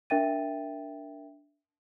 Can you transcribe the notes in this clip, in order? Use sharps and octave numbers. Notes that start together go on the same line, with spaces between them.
D4 A#4 E5 G5 A6 D#7